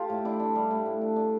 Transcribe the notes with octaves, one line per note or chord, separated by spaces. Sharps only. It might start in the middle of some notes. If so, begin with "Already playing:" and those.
Already playing: F4 G4 A4
A2
D4 E4
D4
G3
A2
A2
D4
D4